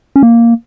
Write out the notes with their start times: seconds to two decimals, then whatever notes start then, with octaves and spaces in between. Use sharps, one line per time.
0.16 C#4
0.23 A#3